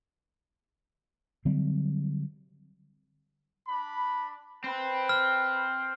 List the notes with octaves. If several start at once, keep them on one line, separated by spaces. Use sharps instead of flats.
D3 F#3 G3 C4
D4 B5
C4 B4
F6